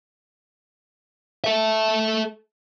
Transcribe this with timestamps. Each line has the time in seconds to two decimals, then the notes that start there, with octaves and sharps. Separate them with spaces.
1.44 A4 E5